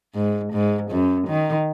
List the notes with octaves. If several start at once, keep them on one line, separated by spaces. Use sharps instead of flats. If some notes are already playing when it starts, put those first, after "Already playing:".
G#2
G#2
F#2
D#3